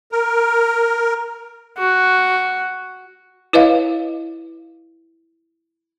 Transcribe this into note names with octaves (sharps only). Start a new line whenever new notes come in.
A#4
F#4
E4 B4 C#5 D#5 F5